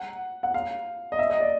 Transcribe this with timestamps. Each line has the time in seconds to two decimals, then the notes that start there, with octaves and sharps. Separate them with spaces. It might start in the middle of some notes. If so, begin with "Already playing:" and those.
Already playing: F#5
0.43 F#5
0.54 F5
1.12 D#5
1.19 E5
1.30 D#5
1.40 D5